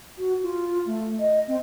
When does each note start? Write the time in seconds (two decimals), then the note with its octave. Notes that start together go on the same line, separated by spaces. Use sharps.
0.18 F#4
0.43 F4
0.86 A3
1.19 D#5
1.48 C4